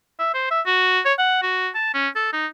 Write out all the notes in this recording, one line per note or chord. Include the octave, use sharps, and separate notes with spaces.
E5
C5
E5
F#4
C#5
F#5
F#4
A5
C#4
A4
D#4